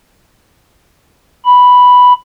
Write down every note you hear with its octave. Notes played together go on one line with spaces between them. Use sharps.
B5